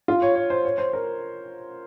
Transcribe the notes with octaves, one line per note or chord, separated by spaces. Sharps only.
F4
C#5
C#5
C5
C#5
C5
A#4